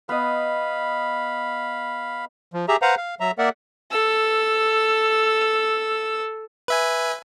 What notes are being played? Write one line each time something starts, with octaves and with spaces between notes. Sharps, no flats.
B3 D#5 F5 B5
F3
G4 G#4 E5 A#5
B4 C5 F5 F#5 A#5
F5
F#3 E5 A#5
A#3 A#4 D5 E5 F#5
A4 E6
B4 E5 G#5